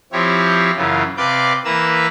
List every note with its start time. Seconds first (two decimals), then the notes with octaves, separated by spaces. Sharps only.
0.13 F3 C4 E4 G4 C#5
0.77 F#2 C#3 E3 F4
1.17 C3 B4 D5 F5 D6 G6
1.65 E3 A#3 B4 A#5 E6